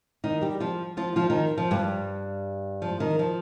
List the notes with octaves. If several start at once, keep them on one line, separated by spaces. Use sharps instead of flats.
D#3 D#4
G3 G4
F3 F4
F3 F4
F3 F4
D#3 D#4
F3
G2 G3
F3
D#3
F3